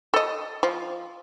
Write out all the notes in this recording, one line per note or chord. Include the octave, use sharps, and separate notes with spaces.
A4 D#5
F3